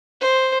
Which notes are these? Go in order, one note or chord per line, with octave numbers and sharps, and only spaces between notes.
C5